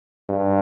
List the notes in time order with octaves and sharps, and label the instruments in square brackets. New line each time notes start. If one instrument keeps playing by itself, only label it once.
[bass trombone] G2